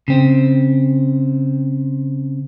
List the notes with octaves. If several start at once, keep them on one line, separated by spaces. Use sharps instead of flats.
C#3 C4